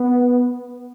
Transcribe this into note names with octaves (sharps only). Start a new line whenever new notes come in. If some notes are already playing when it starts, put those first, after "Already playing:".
Already playing: B3